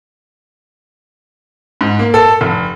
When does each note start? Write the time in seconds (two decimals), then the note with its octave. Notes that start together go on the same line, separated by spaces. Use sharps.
1.81 G#2
1.99 A#3
2.14 A4
2.41 F1